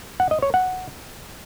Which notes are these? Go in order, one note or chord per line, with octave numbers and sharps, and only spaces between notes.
F#5
D#5
C#5
F#5